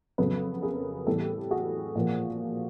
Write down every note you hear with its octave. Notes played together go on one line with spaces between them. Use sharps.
F2 C#3 F#3 B3 A4 B4
G#4 A#4
A2 E3 G3 B3 G4 A4
F#4 G#4
A#2 F3 A#3